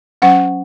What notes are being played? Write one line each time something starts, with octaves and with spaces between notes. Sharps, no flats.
F#3 C#4 F#5